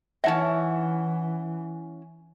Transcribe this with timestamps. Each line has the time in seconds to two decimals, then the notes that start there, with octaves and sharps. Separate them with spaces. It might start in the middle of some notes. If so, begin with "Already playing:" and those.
0.24 E3 C#4 D#4 E4 E5 F#5